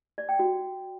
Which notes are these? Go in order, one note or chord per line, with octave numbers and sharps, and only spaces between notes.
D5
G5
F#4